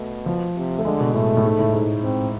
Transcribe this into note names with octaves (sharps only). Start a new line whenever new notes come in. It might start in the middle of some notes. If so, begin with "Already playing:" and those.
Already playing: B2 A3
F3
C3
A3
D3 G#3
B2
A2 A3
A2
G#2
A2
G#2
C4